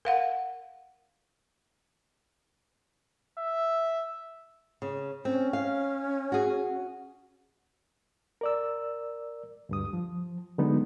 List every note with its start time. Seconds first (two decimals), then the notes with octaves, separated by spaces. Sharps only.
0.05 A#4 F5 F#5
3.39 E5
4.82 C#3
5.25 C4 C#4
5.53 F5
6.32 F#4 G#4
8.41 A#4 D5 E6
9.69 D2 G2 D#6
9.93 F3
10.58 D3 F#3 G#3 B3 D#4